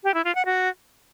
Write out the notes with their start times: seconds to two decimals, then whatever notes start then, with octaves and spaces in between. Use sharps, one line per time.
0.04 G4
0.14 E4
0.24 F4
0.35 F#5
0.45 F#4